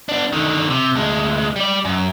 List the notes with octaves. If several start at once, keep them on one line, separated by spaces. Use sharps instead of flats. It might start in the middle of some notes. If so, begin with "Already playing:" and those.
B3 D4
D3 D#3
C3
D2 G#3
G3 D5
F#2